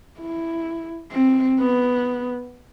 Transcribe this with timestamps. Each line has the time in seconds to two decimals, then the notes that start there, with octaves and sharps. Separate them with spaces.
0.20 E4
1.12 C4
1.59 B3